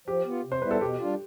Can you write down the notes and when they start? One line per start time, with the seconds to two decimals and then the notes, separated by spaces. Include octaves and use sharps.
0.08 F3 G4
0.26 B3 F4
0.45 C3
0.52 C5
0.62 G3 B3 E4 B4
0.71 A4
0.81 B2 G4
0.99 G3 D4 F4